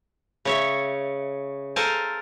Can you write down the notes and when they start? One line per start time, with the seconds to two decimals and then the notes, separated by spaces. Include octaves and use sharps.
0.45 C#3 C#5 E5
1.76 A4 A#4 C5 F5 G#5 A5